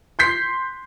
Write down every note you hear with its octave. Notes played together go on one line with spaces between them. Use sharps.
C6 G6 B6 C7